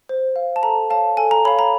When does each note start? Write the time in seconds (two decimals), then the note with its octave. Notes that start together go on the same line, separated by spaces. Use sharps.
0.09 C5
0.36 F5
0.56 A5
0.63 A4 A#5
0.90 C#5 F5 A5
1.17 A4 G#5
1.31 A#5
1.45 C#5 F5 B5
1.59 A#5